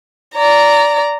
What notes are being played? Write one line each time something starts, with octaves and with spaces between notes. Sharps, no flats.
D5 A#5